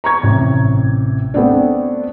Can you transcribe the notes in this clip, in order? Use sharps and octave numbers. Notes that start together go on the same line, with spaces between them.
A#5 C#6 G#6
A1 C3
A3 B3 C4 D4